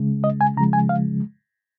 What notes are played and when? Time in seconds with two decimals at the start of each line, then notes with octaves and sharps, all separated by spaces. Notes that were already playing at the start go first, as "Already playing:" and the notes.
Already playing: C#3 G#3
0.24 D#5
0.41 G#5
0.57 C#3 F3 G#3 A#5
0.73 G#5
0.89 F5